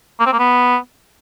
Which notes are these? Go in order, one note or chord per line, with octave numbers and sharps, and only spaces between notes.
A#3
C4
A#3
B3